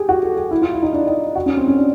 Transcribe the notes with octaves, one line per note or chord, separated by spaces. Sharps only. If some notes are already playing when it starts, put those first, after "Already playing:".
Already playing: G4 G#4
F#4
A4
G#4
E4
F4
E4
D#4
D4
D#4
F#4
C#4
C4
C#4
D4